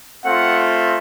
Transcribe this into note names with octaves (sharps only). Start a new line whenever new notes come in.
A3 C4 F4 F#5